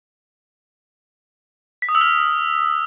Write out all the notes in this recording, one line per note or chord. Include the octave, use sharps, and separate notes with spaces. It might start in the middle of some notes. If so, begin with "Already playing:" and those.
B6
D#6
E6
F6